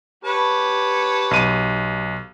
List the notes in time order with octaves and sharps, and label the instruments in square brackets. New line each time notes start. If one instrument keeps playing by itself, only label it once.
[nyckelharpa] G4 [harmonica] B4 C#5 A5
[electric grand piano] B1 D#7